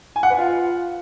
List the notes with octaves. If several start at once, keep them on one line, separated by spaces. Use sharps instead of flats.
G#5
F#5
B4
F4